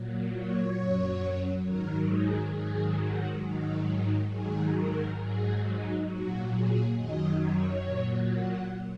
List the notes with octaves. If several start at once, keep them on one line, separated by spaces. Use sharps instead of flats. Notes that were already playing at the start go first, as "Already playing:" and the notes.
Already playing: A#2 F#3
C#5
F#2 F#3
G#2 D#3 F#3 A#4
G#4
G#2 D#3 F#3 G#4
F#4
G#2 D#3 F#3 D#4
G#2 D#3 F#3 G#4
A#4
G#2 F#3 G#4
D#4
A#2 F#3 F#4
G#4
F#2 D#3 F#3 D#5
C#5
A#2 F#3
F#5